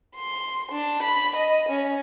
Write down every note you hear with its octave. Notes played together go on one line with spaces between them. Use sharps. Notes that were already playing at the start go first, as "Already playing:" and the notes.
C6
D4
B5
D#5
C#4